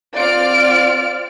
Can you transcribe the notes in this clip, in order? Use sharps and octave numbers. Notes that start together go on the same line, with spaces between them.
C4 F4 D5 F6 D7